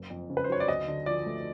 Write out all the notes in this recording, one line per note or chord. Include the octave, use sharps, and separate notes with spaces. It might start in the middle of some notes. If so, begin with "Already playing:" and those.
Already playing: F#1
F2
C#3
B4
C5
F#3 C#5
D5
D2 D#5
D3
F3 D5
A3